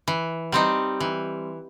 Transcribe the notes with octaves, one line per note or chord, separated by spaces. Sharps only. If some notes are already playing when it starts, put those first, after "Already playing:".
E3
G3 C4 D#4
E3